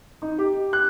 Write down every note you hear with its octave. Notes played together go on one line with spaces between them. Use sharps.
D#4
G4
F#6